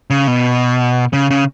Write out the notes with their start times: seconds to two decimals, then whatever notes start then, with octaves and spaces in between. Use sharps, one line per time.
0.10 C#3
0.27 B2
1.13 C#3
1.30 C#3